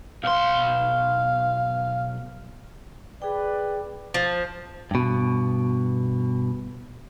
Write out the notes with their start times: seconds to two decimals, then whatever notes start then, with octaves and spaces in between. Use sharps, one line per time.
0.24 B1 F5 C6
3.22 G#4 B4 D5 G5
4.14 F3
4.91 G2 B2